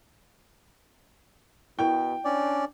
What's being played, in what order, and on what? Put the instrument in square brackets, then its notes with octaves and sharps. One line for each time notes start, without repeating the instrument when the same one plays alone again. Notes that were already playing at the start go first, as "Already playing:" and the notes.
[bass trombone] B2 [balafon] E4 A#4 [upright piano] G5
[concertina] C#4 D5 [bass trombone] D4